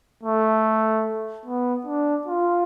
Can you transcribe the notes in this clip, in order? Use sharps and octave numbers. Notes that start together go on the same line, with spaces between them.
A3
B3
D4
F4